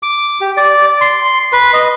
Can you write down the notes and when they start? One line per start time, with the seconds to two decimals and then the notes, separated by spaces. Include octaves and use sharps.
0.03 D6
0.41 G4
0.57 D5
1.01 C6
1.53 B4
1.73 D#5